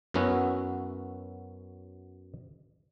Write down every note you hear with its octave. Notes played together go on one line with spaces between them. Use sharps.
F#2 F#3 B3 C#4 E4 F#4